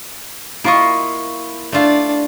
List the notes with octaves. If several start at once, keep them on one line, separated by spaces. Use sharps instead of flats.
A#3 E4 F4 D#5 C#6
A3 D4 F4